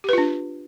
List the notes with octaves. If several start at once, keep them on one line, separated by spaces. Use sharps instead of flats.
D4 F4 G4 B4